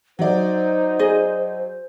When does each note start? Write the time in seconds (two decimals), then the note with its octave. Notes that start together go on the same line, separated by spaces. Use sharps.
0.19 F#3 D#4 C5 D5
0.99 G#4 D#5